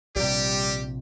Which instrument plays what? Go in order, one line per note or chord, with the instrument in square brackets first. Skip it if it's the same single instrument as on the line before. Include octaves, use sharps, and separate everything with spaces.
[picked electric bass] A#1 C3 [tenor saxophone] G3 [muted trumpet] G4